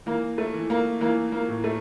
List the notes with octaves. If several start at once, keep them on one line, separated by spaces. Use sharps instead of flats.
E3 A#3
A3
E3
A#3
E3 A#3
A#3
A2
A3